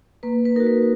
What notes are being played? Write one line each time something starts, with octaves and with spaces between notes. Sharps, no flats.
A#3 B4
B4
D#4 F#4 A#4
B4